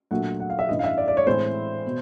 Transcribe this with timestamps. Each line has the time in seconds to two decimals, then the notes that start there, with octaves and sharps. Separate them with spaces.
0.11 A#2 F#3 A3 D4 F#5
0.40 F#5
0.50 F5
0.59 E5
0.69 A1 G2 E3 D#5
0.79 F5
0.84 E5
0.98 D5
1.08 D5
1.17 C#5
1.27 A2 E3 G#3 C4 C5
1.86 B2